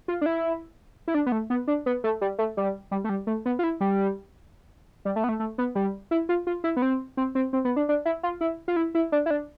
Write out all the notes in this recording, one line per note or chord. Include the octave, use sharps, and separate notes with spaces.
F4
D4
E4
E4
D4
B3
A3
B3
D4
B3
A3
G3
A3
G3
G3
A3
G3
A3
B3
F4
E4
G3
G3
A3
B3
A3
A3
B3
G3
E4
F4
F4
E4
B3
C4
C4
C4
C4
B3
D4
D4
E4
F4
E4
F4
E4
E4
D4
E4
D4